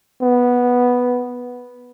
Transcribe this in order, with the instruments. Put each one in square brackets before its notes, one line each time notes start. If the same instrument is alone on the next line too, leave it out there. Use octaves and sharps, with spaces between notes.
[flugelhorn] B3